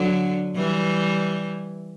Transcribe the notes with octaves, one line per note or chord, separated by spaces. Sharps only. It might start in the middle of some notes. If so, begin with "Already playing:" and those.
Already playing: D3 F#3
E3 G3